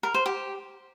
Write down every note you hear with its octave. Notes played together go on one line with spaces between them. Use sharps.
A#4
C5
G4